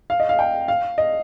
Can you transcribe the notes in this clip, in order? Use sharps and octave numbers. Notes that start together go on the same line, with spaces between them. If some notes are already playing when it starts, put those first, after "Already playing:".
F5
D#5
F5
G5
F5
D#5